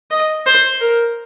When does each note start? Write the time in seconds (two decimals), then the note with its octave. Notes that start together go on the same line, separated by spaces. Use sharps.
0.11 D#5
0.46 C5
0.81 A#4